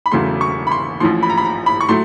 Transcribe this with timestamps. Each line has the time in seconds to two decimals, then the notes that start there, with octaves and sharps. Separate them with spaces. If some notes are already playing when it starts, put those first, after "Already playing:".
0.06 B5
0.11 E1 E2 C#3 F#3 A3 C6
0.41 C#6
0.67 B5
0.71 C6
1.00 A1 A2 F3 C6
1.23 B5
1.30 A#5
1.38 B5
1.45 A#5
1.66 B5
1.81 C#6
1.89 A2 F#3 A3 C6